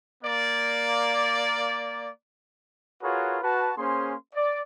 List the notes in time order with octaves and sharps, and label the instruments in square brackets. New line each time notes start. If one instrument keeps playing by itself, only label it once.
[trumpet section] A#3 D5
F4 F#4 G#4 A#4 B4 C#5
F#4 B4 A5
A#3 C#4 G#4 C5 C6
D5